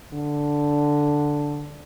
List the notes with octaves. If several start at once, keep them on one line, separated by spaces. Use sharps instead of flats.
D3